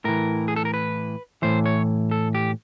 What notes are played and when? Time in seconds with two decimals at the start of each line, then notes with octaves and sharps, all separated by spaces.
0.05 A2 E3 A#4
0.48 G#4
0.56 A4
0.65 A#4
0.74 B4
1.42 A2 E3 C5
1.66 C#5
2.11 A4
2.35 G4